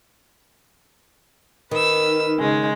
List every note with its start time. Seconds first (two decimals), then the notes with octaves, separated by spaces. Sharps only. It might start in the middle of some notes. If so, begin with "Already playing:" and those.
1.71 D#3 B4 E6
2.38 C#3 G#3